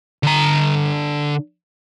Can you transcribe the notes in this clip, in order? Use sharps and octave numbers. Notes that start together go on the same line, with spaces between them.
D3 A#5